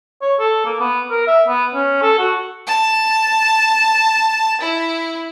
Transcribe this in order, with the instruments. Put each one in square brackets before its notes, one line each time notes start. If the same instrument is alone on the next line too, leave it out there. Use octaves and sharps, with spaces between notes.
[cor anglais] C#5
A4
A#3
B3
A#4
E5
B3
C#4
A4
F#4
[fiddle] A5
E4